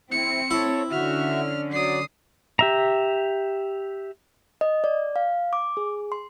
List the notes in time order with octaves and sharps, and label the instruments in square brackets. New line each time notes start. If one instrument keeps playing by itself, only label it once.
[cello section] C4 [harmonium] E4 [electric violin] C#7
[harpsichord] E4 [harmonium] A4 C#5
[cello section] D3 C#4 [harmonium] F#4 E5 [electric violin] F6
[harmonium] F#3 D5 [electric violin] D#6 C7
[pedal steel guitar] G4 E5 A#5
[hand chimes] D#5
D5
F5
D6
G#4
C6